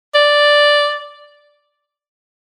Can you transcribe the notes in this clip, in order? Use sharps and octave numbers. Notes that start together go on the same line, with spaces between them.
D5